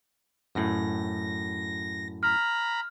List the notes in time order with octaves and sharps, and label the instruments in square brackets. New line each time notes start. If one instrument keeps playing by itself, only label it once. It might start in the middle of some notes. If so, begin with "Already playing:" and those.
[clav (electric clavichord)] F#2 A2 [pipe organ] A#6
[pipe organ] A#5 B5 [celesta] F6